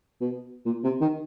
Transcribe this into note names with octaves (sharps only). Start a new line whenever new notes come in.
B2
A#2
C3
D#3